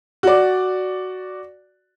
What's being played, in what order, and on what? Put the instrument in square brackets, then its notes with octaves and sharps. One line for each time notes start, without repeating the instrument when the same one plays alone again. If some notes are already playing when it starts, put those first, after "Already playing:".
[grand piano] F#4 D5